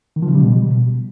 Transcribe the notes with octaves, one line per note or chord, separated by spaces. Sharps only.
D#3
F3
C#3
G3
B2